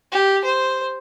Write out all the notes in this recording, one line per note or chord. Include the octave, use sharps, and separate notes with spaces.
G4
C5